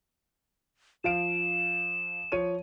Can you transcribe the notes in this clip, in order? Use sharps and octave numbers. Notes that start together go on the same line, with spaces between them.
F3 F5 D7 E7
F3 C#5 D#7